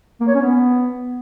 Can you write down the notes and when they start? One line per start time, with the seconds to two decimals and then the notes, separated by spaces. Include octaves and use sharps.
0.20 A#3
0.27 C#5
0.35 C#4
0.42 B3